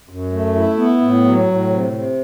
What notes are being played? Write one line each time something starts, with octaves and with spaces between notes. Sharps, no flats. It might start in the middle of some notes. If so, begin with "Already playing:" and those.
F#2
A3
E4
B3
A2
F#3
A2
C3
C3